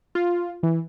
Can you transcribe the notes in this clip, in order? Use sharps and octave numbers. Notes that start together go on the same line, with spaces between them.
F4
E3